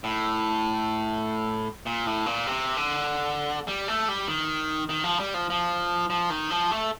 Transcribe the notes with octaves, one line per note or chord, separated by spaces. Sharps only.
A2
A#2
A2
A#2
C3
D3
G3
A3
G3
D#3
D#3
F3
G3
F3
F3
F3
D#3
F3
A3